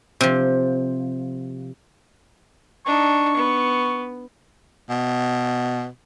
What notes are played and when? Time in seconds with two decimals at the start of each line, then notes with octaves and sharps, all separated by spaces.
0.21 C3 F3
2.86 D4 D#4 C#6
3.37 B3
4.90 B2